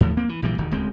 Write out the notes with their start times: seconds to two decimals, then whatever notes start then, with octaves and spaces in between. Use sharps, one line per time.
0.01 D#2 A2 F3
0.17 A#3 C4
0.29 E3
0.42 A#1 A#2 E3 G3
0.58 E1 D#3
0.71 D1 C#2 G#3 C4